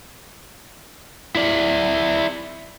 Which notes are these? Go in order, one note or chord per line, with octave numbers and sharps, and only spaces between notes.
E4 D5